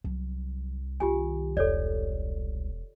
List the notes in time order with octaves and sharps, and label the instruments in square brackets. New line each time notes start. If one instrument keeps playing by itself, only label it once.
[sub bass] C2 [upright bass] F#3
[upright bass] D#3 [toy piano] F4 G4 G#5
[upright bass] E1 [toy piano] A4 C#5 D5